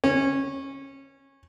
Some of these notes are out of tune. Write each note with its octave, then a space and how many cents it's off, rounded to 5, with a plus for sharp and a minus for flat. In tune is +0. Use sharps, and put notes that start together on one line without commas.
C#4 -20